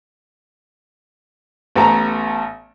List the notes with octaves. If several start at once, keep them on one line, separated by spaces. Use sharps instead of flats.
A1 B3 A4 A5 A#5